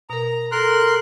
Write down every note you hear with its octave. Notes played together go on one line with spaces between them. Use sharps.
B2 A#4 A#5
A4 A#4 C6 F#6